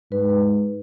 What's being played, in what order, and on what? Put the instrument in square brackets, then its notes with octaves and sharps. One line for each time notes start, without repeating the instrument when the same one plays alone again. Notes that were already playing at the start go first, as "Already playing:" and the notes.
[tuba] G#2 [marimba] B4